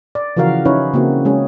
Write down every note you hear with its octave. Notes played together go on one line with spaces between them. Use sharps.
D5
C#3 E3 F3 F#4 A#4 F5
C#4 D#4 E4 B4 C#5
C#3 A#3 C4 E4 F#4
G#3 C#4 G#4